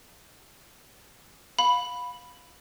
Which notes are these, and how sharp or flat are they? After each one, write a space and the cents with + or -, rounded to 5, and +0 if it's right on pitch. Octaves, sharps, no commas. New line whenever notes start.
F5 +25 B5 +0